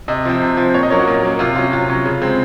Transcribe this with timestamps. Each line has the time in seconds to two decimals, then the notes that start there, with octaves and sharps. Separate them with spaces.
0.08 C3 D#5
0.25 F3 C4
0.41 C3
0.57 F3 C4
0.74 A#2 C#5
0.83 D#5
0.90 F#3 A#3 C#4 C#5
0.99 F#4
1.07 A#2
1.23 F#3 A#3 C#4
1.39 C3 F4
1.56 F#3 C#4 F4
1.72 C3 F4
1.89 F#3 C#4
2.05 C#3
2.22 G#3 C4